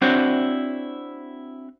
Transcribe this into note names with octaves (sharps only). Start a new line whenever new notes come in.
C4 D4 E4 F#4 C5 C#5